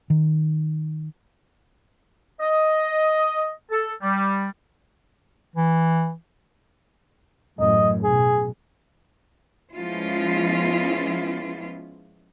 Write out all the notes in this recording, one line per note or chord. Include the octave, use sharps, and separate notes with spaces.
D#3
D#5
A4
G3
E3
A1 F#2 D#5
B1 G#4
F3 G#3 B3 C#4 E4 F4